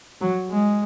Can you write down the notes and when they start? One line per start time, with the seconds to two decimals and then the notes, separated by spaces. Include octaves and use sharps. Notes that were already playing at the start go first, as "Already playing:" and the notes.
0.21 F#3
0.50 G#3